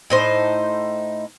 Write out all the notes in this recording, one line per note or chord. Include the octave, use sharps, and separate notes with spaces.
A2 D#4 C5